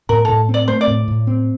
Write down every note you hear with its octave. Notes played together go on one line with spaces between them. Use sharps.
A2 A#4
A2 A4
C4
D5
A3 C5
D5
A2
A2
C4